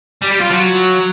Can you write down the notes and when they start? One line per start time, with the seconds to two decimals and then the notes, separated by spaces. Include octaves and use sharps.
0.22 G3
0.31 G4
0.40 F4
0.50 F#3